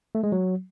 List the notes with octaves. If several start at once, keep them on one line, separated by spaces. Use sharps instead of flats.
A3
G#3
F#3